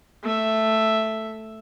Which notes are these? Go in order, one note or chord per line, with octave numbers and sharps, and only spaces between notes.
A3 E5